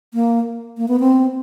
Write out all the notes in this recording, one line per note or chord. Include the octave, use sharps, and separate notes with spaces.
A#3
A#3
B3
C4